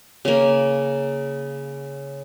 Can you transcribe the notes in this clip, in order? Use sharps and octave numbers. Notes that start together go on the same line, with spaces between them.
C#3 A#3